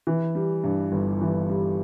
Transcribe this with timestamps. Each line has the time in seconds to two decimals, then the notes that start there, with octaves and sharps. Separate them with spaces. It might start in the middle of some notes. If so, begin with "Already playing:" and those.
0.07 E3
0.35 G3
0.64 G2
0.92 G1
1.21 E3
1.49 G3